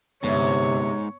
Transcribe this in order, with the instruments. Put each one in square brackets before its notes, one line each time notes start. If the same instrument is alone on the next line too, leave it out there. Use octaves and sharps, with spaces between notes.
[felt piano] G1 E5 [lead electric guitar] G#2 [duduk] C3 [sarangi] C#5